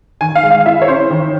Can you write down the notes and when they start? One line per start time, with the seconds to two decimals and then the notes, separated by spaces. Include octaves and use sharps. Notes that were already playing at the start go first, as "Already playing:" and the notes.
0.21 D#3 G#5
0.36 F5
0.43 G#3
0.51 F5
0.66 E4 E5
0.82 C#5
0.88 C#4 C5
1.11 D#3